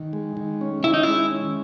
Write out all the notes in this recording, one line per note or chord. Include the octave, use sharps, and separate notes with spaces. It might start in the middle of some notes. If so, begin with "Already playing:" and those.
Already playing: D#3
G#3
D#3
C#4
D#3 E4
D#4
G#3 E4
C#4